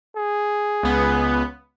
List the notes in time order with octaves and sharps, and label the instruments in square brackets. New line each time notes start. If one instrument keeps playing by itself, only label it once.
[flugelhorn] G#4
[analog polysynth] C#2 B3